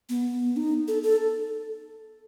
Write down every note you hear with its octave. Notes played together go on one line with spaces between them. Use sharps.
B3
D#4
A4
A4